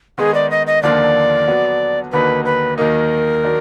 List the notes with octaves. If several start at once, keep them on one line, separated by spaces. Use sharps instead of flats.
D#3 G#3 B3 D#4 G#4
D5
D#5
D#5
D#2 D3 F3 A#3 F4 D5
D3 F#3 B3 D4 F#4
D#2 D3 F#3 A#3 D#4 B4
B4
D#2 D#3 F#3 A#3 D#4 A#4
D#3 F#3 D4